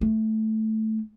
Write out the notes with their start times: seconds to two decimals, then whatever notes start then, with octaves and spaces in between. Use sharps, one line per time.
0.01 A3